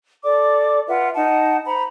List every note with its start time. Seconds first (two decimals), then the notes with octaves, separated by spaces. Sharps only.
0.24 A4 D5 D6
0.88 F4 B4 E5 F#5
1.15 D#4 F#5 A5
1.65 C5 A#5 B5